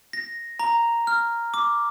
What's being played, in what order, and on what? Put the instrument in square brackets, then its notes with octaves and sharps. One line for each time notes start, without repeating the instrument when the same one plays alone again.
[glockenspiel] A#6
A#5
F6
D6